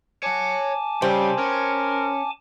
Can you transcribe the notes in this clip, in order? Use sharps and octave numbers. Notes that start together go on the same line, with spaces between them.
C#5 F#5 G#5 A5 D6
C#3 G3 C4
C#4 A#4